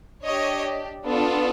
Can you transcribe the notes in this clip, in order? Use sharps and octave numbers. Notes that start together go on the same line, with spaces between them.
D4 G4 C#5 D#5
B3 D4 F4 A4